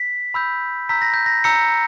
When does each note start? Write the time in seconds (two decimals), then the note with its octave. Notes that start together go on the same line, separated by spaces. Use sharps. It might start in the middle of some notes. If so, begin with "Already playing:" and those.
Already playing: B6
0.34 B5 E6 G6
0.89 A#5 E6 G6 B6
1.02 A#6
1.14 G6
1.26 A#6
1.44 A#5 E6 G6 C#7